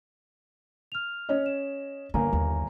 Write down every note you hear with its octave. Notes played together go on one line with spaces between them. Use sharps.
F6 F7
C#4 C#5 D#5
E7
G1 D3 A#3 G#5 A#5
D#2